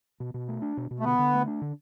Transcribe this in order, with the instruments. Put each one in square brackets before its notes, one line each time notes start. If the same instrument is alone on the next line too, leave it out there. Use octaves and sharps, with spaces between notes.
[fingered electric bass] B2
B2
A3
D4
B2
B2
[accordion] A3
[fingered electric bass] D3 [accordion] B3
[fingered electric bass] D3
A3
D4
D3